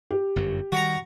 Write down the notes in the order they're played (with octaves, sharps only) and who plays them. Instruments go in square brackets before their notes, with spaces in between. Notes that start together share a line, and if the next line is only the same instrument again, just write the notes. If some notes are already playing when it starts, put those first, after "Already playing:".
[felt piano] G4
[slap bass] G1 F#2 F#3
[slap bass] D#3 G3 [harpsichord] F#4 A#5